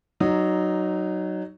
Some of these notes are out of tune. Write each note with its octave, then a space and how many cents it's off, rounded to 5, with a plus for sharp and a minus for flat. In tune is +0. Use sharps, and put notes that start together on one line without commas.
F#3 +10 D#4 -15